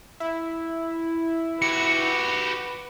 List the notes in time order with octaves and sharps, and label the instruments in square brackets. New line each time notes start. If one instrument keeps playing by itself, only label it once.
[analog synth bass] E4
[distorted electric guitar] F#4 G4 [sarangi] B4 [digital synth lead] C#7